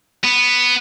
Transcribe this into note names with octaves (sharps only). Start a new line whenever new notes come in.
B3